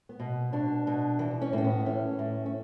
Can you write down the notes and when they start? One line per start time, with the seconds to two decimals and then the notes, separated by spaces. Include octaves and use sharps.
0.09 B3
0.20 B2
0.53 B2 D4
0.87 B2
1.19 E3
1.41 C#4
1.53 A2 C#4
1.64 B3
1.86 E3 C#4
2.19 A2
2.46 C#4